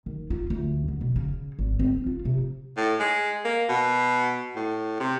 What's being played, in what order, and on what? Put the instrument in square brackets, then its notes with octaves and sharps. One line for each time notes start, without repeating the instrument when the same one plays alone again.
[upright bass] D#3
F4
D2
D3
B2
C#3
G#1
C4
F4
C3
[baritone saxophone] A2
G#3
A#3
B2
A2
C3